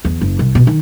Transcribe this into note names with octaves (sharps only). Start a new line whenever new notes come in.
E2
F#1
C2
B2
D#3